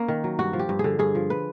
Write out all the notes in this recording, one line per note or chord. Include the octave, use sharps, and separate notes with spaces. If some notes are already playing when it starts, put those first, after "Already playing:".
Already playing: A#3 C#4
D#3
F#3
G2 F#4
F3
G4
G2
G#4
D3
G2 G#4
F3
B4